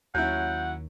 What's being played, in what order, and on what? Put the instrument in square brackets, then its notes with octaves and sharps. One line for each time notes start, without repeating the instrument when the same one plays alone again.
[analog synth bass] D#2 [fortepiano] F#3 C#4 E4 [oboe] F#5 [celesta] G6